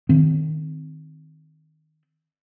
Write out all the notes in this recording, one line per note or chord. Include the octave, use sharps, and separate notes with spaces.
D#3 C4